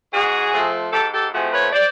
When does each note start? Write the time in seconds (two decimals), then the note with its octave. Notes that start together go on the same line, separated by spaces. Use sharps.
0.13 G#2 F#4 G#4
0.53 F3 A3 C4
0.92 G#2 G4 A4
1.13 G4 A4
1.32 F3 A3 C4 F#4 G#4
1.52 B4 C#5
1.73 C5 D5